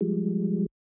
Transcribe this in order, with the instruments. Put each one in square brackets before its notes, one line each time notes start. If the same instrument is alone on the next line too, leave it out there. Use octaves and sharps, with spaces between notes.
[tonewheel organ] F3 G3 G#3